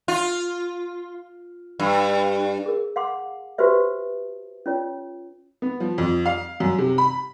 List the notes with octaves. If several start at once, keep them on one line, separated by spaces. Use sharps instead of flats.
F4
G2
G#4 A#4
F5 F#5 C6 D6
F#4 G4 B4 C5 E5
C#4 F4 C#5
B3
F3
F2
F5
F#2
C3
B5